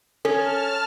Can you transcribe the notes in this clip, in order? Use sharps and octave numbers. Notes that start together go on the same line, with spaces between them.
C#4 A4 A5 F6